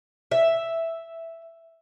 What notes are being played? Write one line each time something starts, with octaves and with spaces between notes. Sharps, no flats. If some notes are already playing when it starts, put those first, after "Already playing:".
E5